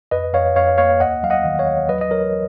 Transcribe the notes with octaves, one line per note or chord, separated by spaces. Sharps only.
F2 B4 D#5
F2 C#5 F5
F2 C#5 F5
A#3 C#5 F5
D#2 D#5 F#5
F#3 F5
D#5 F#5
D#3
C#5 F5
D#2
F#3 B4 D#5
D#5
F#3 A#4 C#5